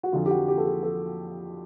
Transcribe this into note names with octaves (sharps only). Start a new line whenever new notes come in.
F#4
F2 D3 F3 F4
G4
F#4
G4
A4
G#4
A4